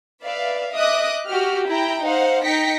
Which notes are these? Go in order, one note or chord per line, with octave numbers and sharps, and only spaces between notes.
B4 D5 E5 F5
D#5 E5 D6 D#6 F#6
F#4 G4 F6
E4 G5 A#5
D#4 C5 F5 F#5
D#4 G5 A#6 B6 C#7